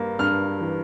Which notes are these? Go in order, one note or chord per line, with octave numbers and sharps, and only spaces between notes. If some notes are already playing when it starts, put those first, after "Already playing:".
Already playing: G2 A#3
G2 F6
E3